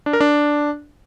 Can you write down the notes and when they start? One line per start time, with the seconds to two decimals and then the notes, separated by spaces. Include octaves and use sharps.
0.06 D4
0.13 A#4
0.20 D4